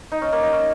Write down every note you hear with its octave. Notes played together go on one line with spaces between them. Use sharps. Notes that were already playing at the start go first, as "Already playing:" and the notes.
D#4
C#4
A#3
D#4
C#4